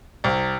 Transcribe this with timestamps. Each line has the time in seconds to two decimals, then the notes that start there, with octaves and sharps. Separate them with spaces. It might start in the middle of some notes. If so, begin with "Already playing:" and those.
0.24 C2